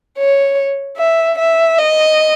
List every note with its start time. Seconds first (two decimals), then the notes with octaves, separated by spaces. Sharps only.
0.18 C#5
0.98 E5
1.38 E5
1.78 D#5